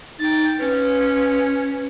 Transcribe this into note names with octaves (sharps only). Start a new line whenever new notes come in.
D#4 G5 A6
C#4 B4